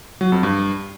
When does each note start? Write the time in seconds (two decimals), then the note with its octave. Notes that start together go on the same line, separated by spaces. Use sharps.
0.21 F#3
0.32 F2
0.43 G2